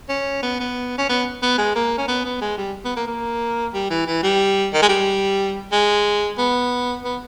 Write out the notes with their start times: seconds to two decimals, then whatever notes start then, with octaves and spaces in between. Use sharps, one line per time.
0.09 C#4
0.43 B3
0.60 B3
0.98 C#4
1.09 B3
1.42 B3
1.58 G#3
1.75 A#3
1.98 C#4
2.08 B3
2.25 B3
2.41 G#3
2.58 G3
2.85 B3
2.96 A#3
3.07 A#3
3.74 G3
3.90 E3
4.06 E3
4.23 G3
4.73 D#3
4.82 G#3
4.89 G3
5.72 G#3
6.38 B3
7.04 B3